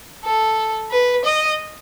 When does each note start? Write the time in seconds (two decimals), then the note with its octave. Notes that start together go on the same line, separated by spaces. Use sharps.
0.25 A4
0.91 B4
1.25 D#5